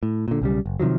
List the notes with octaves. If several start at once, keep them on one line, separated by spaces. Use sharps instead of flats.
A2
A#2 D3
B1 C#3 G3
F#1
C3 D#3 F3 F#3